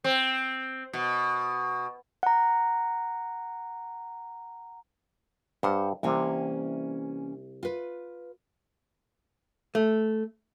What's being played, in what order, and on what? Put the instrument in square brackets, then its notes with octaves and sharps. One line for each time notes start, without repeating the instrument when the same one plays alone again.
[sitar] C4
B2
[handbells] F#5 A#5
[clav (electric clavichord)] G2 [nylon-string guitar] C5 F#5
[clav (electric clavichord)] C2 C3 [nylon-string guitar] E3 A#3 C#4
[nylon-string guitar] F4 B4
[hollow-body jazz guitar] A3